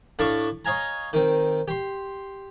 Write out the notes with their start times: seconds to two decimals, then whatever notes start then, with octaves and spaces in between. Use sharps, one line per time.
0.19 A2 D4 F5 A5 C#6
0.65 C#5 D#5 F5 G#5 A#5
1.13 D#3 C4
1.68 G4 C6